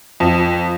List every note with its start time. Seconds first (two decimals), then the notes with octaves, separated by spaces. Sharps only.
0.20 F2